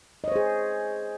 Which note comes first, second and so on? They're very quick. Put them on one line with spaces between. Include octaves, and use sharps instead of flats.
D#5 C#5 C5 G#4